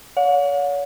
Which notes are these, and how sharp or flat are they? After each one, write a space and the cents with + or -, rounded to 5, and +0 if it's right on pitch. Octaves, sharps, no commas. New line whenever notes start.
C#5 +40 F#5 -45